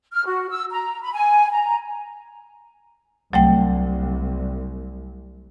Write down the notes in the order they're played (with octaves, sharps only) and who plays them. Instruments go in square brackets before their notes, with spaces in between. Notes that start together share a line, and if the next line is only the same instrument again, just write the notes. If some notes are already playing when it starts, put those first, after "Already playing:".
[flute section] F6
F#4
E6
A#5
B5
G#5
A#5
[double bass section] C2 [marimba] F#3 A3 G5